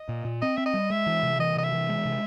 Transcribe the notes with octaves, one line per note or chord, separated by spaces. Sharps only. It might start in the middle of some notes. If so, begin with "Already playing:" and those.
Already playing: D#5
A#2
A#2
C4 D#5
C4 E5
D#5
G3
G#3 E5
E3
C3
E3 D#5
C3 D#5
E5
E3
G#3
C3